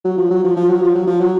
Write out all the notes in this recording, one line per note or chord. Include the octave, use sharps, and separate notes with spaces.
F#3
F3
F#3
F3
F3
F#3
F3
F#3
F3
F#3